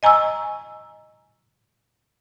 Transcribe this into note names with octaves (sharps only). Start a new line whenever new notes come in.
D#5 G#5 A#5 C#6 E6